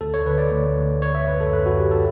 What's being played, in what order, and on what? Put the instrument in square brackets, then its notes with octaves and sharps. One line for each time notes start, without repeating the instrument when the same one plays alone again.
[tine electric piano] D2 A4
C#5
D3 B4
D5
D2
D2
D3 C#5
E5
F#2 B4
A4
F#2 B4
F#4
F#2 G4
A4